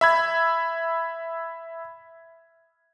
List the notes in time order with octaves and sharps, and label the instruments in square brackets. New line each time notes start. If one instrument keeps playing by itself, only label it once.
[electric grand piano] E5 B5 G#6